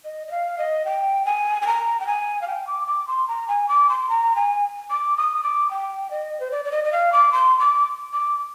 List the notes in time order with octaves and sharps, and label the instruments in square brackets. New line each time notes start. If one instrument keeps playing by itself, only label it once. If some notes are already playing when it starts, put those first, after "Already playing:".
[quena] D#5
D#5
F5
D#5
G5
G#5
G#5
A#5
G5
G#5
F5
G5
D6
D6
C6
A#5
G#5
D6
C6
A#5
G#5
D6
D#6
D6
G5
D#5
C5
D5
D5
D#5
D#5
F5
D6
C6
D6
D6